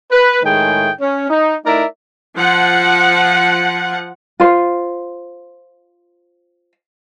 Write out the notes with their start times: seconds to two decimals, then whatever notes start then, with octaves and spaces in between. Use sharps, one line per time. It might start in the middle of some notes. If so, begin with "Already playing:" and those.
0.12 B4
0.43 A2 D#3 G#3 A3 G#4 G5
1.01 C#4
1.30 D#4
1.66 A3 D#4 E4 A#4 D5 E5
2.35 F3 F#5
4.40 F4 C5